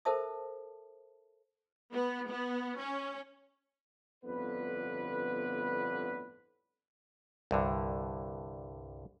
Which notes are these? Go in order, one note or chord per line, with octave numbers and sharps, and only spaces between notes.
A4 A#4 C5 E5 A5 D#6
B3
B3
C#4
G1 F2 A2 D3 B3 B4
C2 G2 D3